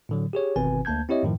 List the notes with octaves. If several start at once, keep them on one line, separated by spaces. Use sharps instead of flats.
A2 D3 F#3
G4 G#4 C#5
G1 B2 D#3 C4 B4 G#5
D2 A#3 A5 G6 G#6
C4 E4 G4 C#5 D#5 E5
F#2 A2 D#3 F3